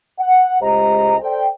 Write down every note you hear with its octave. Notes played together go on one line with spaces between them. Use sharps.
F#5
C#2 G#3 G4 C5 D#5 A#5
A4 C5 D5 G5